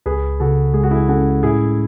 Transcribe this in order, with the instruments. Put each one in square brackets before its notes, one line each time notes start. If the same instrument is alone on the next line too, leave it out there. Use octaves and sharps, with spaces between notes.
[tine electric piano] C#2 [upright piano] G#4 B4
[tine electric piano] C#3 [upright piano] F#4 A4
[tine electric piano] G#3 [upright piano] G#4
[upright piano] F#4
E4 G#4
[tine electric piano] C#4 [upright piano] F#4 A4
[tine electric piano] A2 [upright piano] E4 G#4